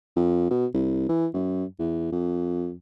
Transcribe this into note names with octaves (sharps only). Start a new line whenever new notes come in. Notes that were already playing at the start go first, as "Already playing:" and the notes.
F2
B2
C2
E3
F#2
E2
F2